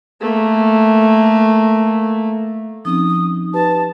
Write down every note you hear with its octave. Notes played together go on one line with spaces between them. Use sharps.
A3 A#3
F3 C4 C#4 D#4 D#6
G4 B4 A5